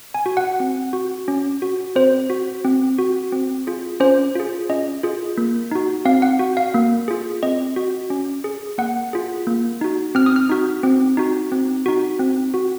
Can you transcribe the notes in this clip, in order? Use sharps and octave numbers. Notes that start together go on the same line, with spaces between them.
G#5
F#4
F#5
C4
F#4
C#4
F#4
C4 C5
F#4
C4
F#4
C4
F4 G#4
C#4 C5
F4 G#4
C#4 D#5
F4 G#4
A#3
D#4 F#4
C4 F5
F#5
F#4
F5
A#3
F4 G#4
C4 D#5
F#4
C#4
G#4
A#3 F#5
F4 G#4
A#3
D#4 F#4
C4 F6
D#6
F6
D#4 F#4
C4
D#4 F#4
C4
D#4 F#4
C4
F#4